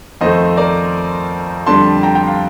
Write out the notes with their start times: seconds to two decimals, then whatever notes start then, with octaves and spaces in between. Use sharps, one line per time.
0.21 F2 D#3 A3 C5 D#5
0.57 A#4 D5
1.66 F2 D3 G3 A5 C6
2.03 G5 A#5
2.15 G5 A#5
2.27 F5 A5